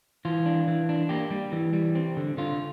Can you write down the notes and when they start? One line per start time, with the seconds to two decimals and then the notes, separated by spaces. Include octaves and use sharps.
0.25 E3 F4
0.46 D4
0.68 E3
0.89 D4
1.09 A#3 G4
1.31 G3
1.52 E3
1.73 G3
1.95 C4
2.17 D3
2.37 D3 F4